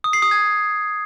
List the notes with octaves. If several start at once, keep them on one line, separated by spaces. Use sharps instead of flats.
D#6
C7
D#6
G#6